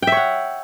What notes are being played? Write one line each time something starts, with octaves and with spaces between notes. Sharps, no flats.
C#5 E5 F#5 G5